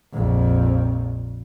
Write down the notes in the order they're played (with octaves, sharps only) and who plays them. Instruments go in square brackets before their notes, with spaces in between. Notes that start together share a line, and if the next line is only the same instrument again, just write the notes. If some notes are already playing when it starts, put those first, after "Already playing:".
[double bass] A#1 F2